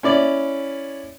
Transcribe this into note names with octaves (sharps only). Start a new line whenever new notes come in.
C#4 E4 D5